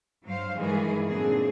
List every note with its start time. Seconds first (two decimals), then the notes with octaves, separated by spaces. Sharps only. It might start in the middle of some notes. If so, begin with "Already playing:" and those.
0.24 G2 F#3 C5 F5
0.59 G2 D#3 E3 G#3 G#4
1.07 A#2 D3 F#3 C4 D4 G#4